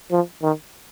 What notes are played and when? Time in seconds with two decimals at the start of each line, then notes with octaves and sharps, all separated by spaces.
0.11 F3
0.42 D#3